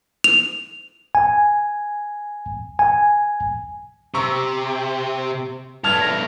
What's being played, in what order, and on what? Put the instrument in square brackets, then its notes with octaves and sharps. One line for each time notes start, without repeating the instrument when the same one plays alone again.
[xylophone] F7
[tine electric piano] G#5
G#5
[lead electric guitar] C3 [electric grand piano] A#5 C#6 E6
[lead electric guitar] G2 A3 [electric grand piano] A5 F6 G#6 [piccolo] F7
[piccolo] A#6